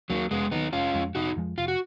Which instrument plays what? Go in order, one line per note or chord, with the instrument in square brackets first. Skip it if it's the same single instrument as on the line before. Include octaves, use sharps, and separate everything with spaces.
[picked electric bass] D#2 D#3 [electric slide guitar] F#3 A#3
[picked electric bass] F1 [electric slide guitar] G#3 B3
[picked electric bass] D#2 D#3 [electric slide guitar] B3 D#4
[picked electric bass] F1 [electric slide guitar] C#4 F4
[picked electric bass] F2 F3 G#3
[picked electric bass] F1 [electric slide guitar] D#4 F#4
[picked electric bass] F2 F3 G#3
[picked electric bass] F1 [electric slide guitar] F4
[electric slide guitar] F#4